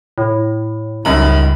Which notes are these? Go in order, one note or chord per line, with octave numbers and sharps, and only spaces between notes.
A2
C#2 F#2 G3 D#4 A#5 B5